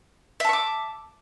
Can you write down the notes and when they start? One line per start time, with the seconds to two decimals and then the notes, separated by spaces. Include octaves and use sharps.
0.40 E5
0.44 A5
0.49 C#6
0.53 D6